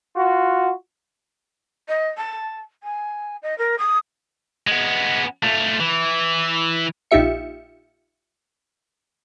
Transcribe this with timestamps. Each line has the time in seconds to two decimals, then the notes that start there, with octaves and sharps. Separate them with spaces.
0.16 F4 F#4
1.88 D#5
2.17 A5
2.83 G#5
3.42 D#5
3.58 A#4
3.78 D#6
4.67 G#3 B3
5.43 A3 F4
5.80 E3
7.11 A#1 D#4 F4 G4 E5 C#7